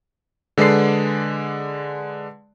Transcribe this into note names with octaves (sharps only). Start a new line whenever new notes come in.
D3 G#3 B4 D5 C7